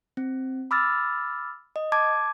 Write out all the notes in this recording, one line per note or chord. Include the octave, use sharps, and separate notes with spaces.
C4
B5 D6 E6 F6 A6
D#5
A5 D6 G#6